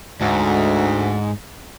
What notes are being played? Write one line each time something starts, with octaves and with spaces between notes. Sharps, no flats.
D2 G#2